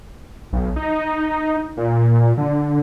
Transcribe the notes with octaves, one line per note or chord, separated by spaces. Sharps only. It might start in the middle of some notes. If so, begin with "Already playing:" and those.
B1
D#4
A#2
D3